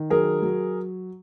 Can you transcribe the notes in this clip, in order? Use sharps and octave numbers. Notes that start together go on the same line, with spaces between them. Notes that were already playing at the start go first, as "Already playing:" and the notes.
Already playing: D#3
F#3 G#4 A#4
F#3